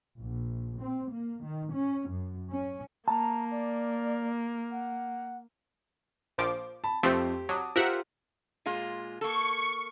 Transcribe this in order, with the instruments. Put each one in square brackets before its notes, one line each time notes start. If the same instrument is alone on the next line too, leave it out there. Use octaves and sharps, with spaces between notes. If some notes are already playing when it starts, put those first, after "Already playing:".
[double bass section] A#1
C4
A#3
D#3
C#4
F#2
C#4
[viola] A#3 [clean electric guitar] A5 [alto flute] A#5
[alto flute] D5
F#5
[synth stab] A#1 F3 D6 [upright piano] C5
[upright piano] A5 B5
[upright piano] F2 [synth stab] F3 A3 C4 [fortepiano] G4 C5
[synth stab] F#3 [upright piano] A5 D6 D#6
[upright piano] F4 [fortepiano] G4 C5 F6 [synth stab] A#4 E5 F#5
[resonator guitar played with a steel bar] A#2 G#3 F4
[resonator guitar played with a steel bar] A#3 A4 [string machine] C#6